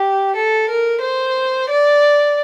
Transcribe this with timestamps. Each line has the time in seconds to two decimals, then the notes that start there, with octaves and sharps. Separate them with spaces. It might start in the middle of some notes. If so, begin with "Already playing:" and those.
Already playing: G4
0.36 A4
0.69 A#4
1.02 C5
1.70 D5